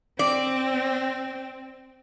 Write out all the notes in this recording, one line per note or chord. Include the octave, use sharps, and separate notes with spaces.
C4 D5